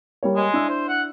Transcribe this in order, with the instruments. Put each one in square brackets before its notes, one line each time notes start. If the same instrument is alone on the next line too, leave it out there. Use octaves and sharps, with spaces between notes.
[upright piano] G3 A#3 C#5
[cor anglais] G#3
[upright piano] D4 E4 E6
[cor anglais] C5
F#5